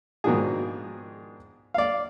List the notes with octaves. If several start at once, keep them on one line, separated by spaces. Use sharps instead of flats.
G#2 B2 D#3 F3 D4 G#4
D5 F5